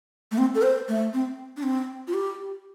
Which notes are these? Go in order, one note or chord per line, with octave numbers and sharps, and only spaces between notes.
A3
C4
A4
C5
A3
C4
D4
C4
F4
G4